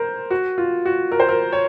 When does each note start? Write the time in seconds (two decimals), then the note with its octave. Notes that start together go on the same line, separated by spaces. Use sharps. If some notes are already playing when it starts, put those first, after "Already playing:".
Already playing: A#4 C5
0.30 F#4
0.58 F4
0.85 F#4
1.12 A#4
1.20 C5
1.29 A#4
1.53 C#5